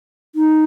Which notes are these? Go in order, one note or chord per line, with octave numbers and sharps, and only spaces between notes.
D#4